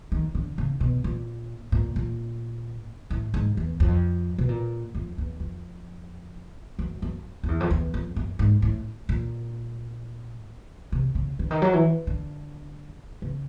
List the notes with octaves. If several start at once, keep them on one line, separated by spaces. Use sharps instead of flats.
D#3
D3
C#3
B2
A#2
A#2
A#2
A2
G#2
E2
F2
B2
A#2
F2
E2
F2
F#2
F#2
F2
E2
F2
E2
F2
F#2
G#2
A2
A#2
C3
C#3
D3
D#3
F#3
E3
D3
C#3